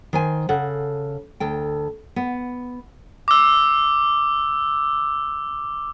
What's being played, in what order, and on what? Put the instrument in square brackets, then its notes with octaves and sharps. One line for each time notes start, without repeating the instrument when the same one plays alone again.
[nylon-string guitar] D#3 C5 G#5
C#3 A4 F#5
D2 A4 G5
B3
[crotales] D6 E6